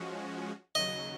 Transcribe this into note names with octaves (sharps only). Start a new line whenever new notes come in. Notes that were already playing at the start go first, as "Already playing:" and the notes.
Already playing: F3 G#3 C#4 F#4
D#2 C#3 F#3 D#5